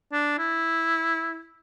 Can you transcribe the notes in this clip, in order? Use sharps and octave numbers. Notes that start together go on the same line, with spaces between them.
D4
E4